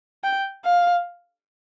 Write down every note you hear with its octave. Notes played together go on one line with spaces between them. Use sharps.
G5
F5